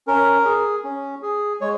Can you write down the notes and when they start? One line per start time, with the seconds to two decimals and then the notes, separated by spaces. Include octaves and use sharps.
0.07 C#4 A#4
0.45 G#4
0.84 C#4
1.22 G#4
1.61 G#3 C#5